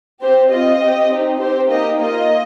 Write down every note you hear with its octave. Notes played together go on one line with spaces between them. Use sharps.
C4 G4 C5
C4 F4 D#5
C4 G4
C4 D#4 G4
C4 G4 C5
A#3 D#4 G4 D#5
A#3 F4 D#5